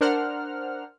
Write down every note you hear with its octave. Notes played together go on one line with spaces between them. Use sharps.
D4 A#4 C5 F#5 F6